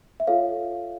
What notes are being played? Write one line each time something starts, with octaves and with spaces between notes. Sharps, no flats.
E5
F4 A4 C#5 F5